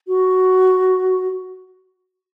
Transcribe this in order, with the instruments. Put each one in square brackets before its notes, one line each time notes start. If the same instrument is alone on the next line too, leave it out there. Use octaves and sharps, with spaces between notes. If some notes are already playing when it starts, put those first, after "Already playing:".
[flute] F#4